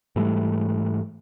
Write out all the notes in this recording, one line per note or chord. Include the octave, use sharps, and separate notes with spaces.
G#2 E3 G3 A3